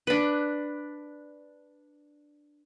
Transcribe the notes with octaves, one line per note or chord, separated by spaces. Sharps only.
D4 B4